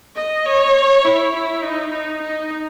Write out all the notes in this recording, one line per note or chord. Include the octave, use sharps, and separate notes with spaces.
D#5
C#5
E4
E4
D#4
D#4
D#4